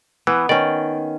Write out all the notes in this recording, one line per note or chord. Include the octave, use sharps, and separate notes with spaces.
E3 B3
D#3 C#4 D5